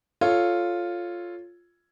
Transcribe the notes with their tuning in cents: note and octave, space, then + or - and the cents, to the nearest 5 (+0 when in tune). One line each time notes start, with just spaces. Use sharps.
F4 +0 A4 +0 C#5 +0